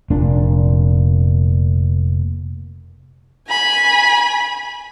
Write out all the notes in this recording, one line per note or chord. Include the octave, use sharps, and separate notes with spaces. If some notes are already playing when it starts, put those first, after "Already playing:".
F1 A#2 D4
G#5 B5